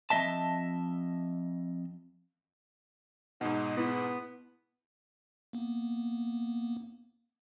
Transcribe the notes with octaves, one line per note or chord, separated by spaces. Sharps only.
F2 A#3 D#5 E5 A5
G#2 B2 D#4 F#5 A#5
B3 E4
A#3 B3